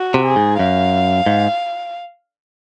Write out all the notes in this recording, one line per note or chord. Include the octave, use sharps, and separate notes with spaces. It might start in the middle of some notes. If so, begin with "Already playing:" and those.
Already playing: F#4
C3
G#4
G#2
F#2 F5
G#2